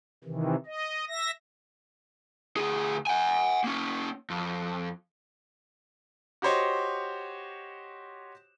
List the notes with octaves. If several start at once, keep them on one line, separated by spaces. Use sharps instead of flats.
C3 D#3 E3
D#5
E5 A#6
D2 G#4
F#5 G#5
A#3 C#4
F2
F#4 G4 C5 C#5 D#5